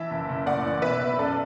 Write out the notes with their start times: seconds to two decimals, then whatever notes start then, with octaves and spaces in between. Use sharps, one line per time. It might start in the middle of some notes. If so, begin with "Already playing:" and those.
Already playing: E3 E5 A5
0.11 F#1
0.29 F#1
0.46 A2 D5 F#5
0.65 E3
0.82 B1 B4 E5
1.00 B1
1.18 F#2 A4 D5